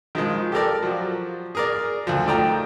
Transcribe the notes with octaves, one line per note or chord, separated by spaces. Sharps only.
D#3 F3 G#3
G4 A4 A#4 D5
F3 F#3
G#4 A#4 D5
D2 F3
D#3 A3 D5 G5 A#5